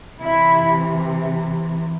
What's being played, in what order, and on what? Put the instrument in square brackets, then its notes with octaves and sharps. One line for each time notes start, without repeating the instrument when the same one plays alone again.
[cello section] C3 E3 E4